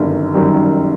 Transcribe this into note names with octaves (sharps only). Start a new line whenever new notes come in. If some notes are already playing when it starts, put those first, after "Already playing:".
Already playing: G1 F#2 D#3 G3
F#2 D#3 G3